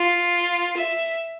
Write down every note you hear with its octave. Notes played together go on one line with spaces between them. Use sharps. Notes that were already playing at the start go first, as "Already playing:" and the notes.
Already playing: F4
E5